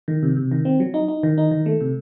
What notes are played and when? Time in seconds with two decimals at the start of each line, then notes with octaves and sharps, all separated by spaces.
0.08 D#3
0.23 C3
0.37 C3
0.51 D#3
0.65 C4
0.80 F#3
0.94 D#4
1.08 D#4
1.23 D#3
1.38 D#4
1.51 D#3
1.66 A3
1.81 C3